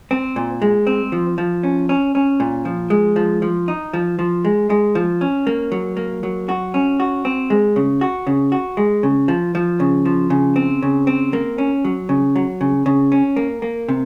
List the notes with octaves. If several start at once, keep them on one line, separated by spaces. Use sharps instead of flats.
C4
A#2
G#3
C4
F3
F3
C#4
C#4
C#4
A#2
F3
G#3
F3
F3
D#4
F3
F3
G#3
G#3
F3
C#4
A#3
F#3
A#3
F#3
F#4
C#4
F#4
C4
G#3
C#3
F#4
C#3
F#4
G#3
C#3
F3
F3
C#3
F3
C#3
C4
C#3
C4
A#3
C#4
F#3
C#3
F#3
C#3
C#3
C#4
A#3
A#3
C3